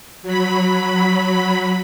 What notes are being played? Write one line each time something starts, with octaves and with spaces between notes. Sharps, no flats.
F#3 B5